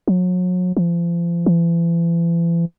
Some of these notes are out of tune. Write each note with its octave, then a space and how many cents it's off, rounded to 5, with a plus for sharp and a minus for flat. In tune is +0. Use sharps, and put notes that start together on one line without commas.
F#3 -35
F3 -35
E3 +40